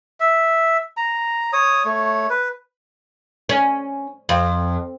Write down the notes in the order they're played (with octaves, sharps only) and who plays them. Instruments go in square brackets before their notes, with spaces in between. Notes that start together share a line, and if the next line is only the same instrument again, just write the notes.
[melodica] E5
A#5
C#5 D#6
A3 C#5
B4
[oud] C#4
F2